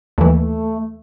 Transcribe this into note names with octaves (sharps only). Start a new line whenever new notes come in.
D#2 E3 A3